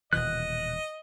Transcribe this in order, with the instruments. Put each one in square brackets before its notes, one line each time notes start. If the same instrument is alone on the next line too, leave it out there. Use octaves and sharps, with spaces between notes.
[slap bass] D#1 B2 E3 [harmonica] D#5 [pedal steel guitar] F#6